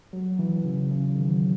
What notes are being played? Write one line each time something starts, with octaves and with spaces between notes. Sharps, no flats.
F#3
E3
C#3
C#3
D#3
F#3